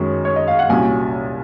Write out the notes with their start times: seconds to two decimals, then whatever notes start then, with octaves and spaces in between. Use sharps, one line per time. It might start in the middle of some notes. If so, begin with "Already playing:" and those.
Already playing: F#2 D#3 G#3 C#4
0.25 C#5
0.36 D#5
0.48 F5
0.59 F#5
0.70 C2 A#2 F#3 C#4 G#5